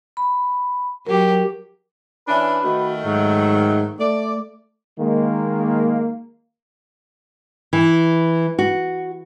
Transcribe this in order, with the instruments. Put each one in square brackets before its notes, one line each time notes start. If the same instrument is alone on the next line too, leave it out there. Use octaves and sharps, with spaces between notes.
[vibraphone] B5
[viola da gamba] F#3 G4 [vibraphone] A#4
[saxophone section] E3 C#4 D4 [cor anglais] B4
[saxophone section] D#3 A3 [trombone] F#4
[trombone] G#2 [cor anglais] F#3
[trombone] A3 [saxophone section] D5
[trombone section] D#3 G#3 A#3
[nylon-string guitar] E3
F#4